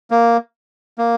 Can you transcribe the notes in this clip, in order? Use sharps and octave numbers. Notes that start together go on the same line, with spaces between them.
A#3
A#3